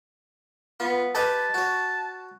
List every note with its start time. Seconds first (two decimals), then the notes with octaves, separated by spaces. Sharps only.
0.80 B3 F4
1.15 G4 B4 D#5 A5
1.54 F#4 C#5